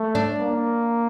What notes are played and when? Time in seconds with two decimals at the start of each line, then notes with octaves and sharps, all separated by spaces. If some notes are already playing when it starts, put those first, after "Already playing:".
Already playing: A3
0.15 D4
0.40 A#3